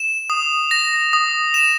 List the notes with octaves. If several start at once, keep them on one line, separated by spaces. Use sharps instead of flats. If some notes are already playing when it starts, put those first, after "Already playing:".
Already playing: E7
D#6
A#6
D#6
E7